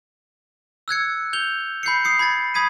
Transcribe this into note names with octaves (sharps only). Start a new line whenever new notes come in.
E6 F#6 G#6 C#7
G6 F7 G7
B5 G6 C7 C#7
D#6 C7 C#7
B5 G#6 A6
B5 D#6 G#6 B6 D#7